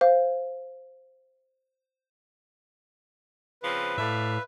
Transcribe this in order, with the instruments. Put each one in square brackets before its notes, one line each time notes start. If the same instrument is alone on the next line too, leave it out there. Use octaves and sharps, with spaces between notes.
[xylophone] C5 F5
[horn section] C#3 F3 C4 [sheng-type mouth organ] B4
[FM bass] A2 [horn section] D5 E5 F5